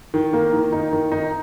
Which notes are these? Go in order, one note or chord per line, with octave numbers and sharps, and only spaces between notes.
D#3
A#3
D#3
D#4
D#3
D#4